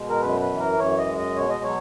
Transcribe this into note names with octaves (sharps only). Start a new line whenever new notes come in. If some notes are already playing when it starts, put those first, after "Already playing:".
Already playing: B2 G#3
A#4
F#2 B4
B4
E3
A#4
F#2 C#5
D#5
G#3
D#5
B2 C#5
D#5
F#3 C#5